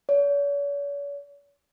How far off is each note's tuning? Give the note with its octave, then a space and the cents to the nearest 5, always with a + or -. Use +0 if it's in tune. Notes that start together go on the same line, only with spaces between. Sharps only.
C#5 +45